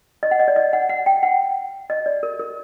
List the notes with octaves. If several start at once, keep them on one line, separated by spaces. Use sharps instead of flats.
D#5
F#5
D#5
D5
D#5
F#5
F#5
G5
F#5
D#5
D5
A#4
A#4